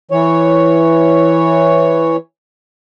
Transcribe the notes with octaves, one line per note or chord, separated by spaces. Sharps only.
E3 C#5